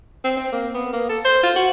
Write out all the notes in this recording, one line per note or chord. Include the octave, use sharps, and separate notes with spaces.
C4
C4
A#3
B3
A#3
A4
C5
F4
F#4